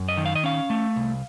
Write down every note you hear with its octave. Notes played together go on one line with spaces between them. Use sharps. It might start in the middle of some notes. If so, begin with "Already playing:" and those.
Already playing: F#2
D#5
D#3
F5
D#5
C#4 F5
A3
C2